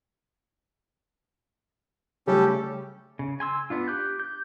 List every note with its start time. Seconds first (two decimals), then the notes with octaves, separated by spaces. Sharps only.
2.27 C#3 G3 A3 C#4 G4 A4
3.19 C#3
3.40 G#5 C6 E6
3.70 B3 D4 F4
3.88 G4 D6 F#6 G6
4.20 G6